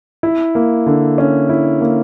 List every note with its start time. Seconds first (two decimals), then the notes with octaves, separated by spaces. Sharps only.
0.23 E4
0.55 A#3
0.86 D3
1.18 C#4
1.49 E4
1.81 A#3